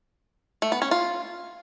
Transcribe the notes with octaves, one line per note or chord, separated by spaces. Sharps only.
A3
B3
C#4
F4